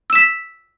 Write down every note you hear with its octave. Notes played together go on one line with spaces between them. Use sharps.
E6 B6 E7